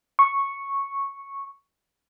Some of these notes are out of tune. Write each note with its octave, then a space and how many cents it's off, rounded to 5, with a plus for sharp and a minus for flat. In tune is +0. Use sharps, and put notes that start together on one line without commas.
C#6 -5